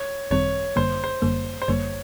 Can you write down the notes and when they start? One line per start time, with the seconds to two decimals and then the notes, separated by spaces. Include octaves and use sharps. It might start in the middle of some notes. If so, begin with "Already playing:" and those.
Already playing: C#5
0.31 G#1 F#2 D#3 G3 C4 C#5
0.76 G1 F#2 D3 G3 A#3 C5
1.04 C5
1.22 G1 F#2 D3 G3 A#3
1.62 C5
1.68 G1 F#2 D3 G3 A#3 C#5